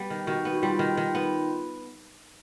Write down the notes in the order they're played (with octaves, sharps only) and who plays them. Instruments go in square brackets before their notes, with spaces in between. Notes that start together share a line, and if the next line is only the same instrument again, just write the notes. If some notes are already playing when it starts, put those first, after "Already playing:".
Already playing: [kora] G3 B3
D#3
[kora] D#3 [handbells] F#4
[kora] B3
[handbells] F#4
[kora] G3 [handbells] F4
[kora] D#3
D#3
B3